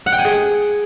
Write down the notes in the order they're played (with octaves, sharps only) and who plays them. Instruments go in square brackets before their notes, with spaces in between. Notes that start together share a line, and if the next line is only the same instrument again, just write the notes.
[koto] F#5
G5
G#5
G#4